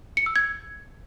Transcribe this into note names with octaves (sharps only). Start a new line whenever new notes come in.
C#7
E6
G#6